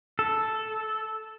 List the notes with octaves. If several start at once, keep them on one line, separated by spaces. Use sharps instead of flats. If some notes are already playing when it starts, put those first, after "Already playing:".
A4